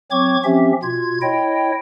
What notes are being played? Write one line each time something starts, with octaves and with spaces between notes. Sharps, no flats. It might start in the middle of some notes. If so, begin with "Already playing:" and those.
F#3 C4 C#5 C#6 D6 G#6
F3 C4 C#4 G4 E5
B2 F4 G#6
E4 C#5 D#5 G5